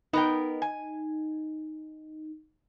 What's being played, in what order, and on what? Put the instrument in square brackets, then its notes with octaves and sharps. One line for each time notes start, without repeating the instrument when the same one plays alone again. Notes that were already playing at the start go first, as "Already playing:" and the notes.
[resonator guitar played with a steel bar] B3 A#4 G5 [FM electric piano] D#4
[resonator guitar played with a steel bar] G#5